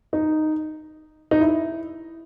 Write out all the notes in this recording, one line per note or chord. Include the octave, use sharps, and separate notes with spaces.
D#4
D#4
E4